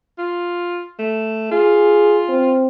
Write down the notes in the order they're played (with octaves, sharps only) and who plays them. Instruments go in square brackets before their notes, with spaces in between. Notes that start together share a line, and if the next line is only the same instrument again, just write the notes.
[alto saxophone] F4
A3
[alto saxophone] F4 [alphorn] G#4
[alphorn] C4